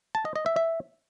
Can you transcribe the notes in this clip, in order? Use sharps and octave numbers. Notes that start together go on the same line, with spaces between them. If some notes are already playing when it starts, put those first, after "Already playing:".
A5
D#5
D#5
E5
E5